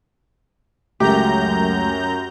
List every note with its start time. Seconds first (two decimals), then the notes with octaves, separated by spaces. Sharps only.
1.00 C#2 F#2 A3 G4 A#5 G6